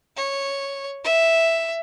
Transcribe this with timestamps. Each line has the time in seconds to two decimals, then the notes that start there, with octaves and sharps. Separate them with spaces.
0.17 C#5
1.04 E5